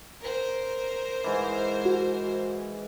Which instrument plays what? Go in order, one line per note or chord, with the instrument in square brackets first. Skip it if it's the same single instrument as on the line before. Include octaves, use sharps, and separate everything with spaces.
[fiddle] A#4 C5
[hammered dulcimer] G#2 E3
[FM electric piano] F#4